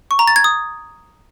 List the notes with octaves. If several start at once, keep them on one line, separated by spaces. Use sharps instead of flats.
C#6
A#5
A6
G#6
D#6